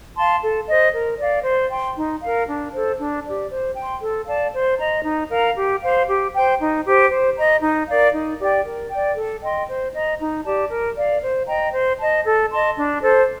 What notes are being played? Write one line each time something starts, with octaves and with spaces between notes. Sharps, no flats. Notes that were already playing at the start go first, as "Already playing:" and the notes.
F5 A5 C6
A4
C5 D#5
A#4
D5 F5
C5
G5 C6
D#4
A#4 F5
D4
A4 C5
D4
G4 D5
C5
G5 C6
A4
D5 F5 A5
C5
D#5 A#5
D#4
A#4 F5 A#5
G4
C5 F5
G4
C5 G5
D#4
G4 C5
C5
D#5 A#5
D#4
A#4 D5 F5
D#4
G4 D5 G5
A#4
D5 G5
A4
D#5 G5 C6
C5
D#5 A#5
D#4
G4 D5 A5
A#4
D5 F5
C5
D#5 G5 A#5
C5
D#5 A5
A4
D#5 A5 C6
D4
A4 C5